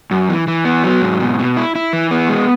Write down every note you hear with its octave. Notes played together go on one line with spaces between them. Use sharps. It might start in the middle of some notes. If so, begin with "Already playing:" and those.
F#2
E3
E3
B3
F#3
G#2
B2
B2
E4
E4
E3
B3
G#3